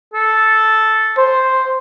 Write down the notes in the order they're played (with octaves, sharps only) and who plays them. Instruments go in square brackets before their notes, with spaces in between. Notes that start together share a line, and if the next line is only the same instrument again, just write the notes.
[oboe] A4
[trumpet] C5